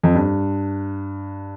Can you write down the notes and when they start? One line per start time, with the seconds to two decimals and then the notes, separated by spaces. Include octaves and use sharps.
0.03 F2
0.15 G2